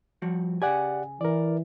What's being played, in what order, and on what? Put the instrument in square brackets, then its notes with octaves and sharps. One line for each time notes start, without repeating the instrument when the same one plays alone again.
[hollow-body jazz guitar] F3 G3 F#4
[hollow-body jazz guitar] C#3 G#5 [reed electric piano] G4 D5 F#5
[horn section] E3 [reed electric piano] A#4 D5